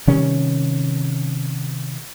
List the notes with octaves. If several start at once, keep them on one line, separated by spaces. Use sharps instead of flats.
C3 D#3 G3 C#4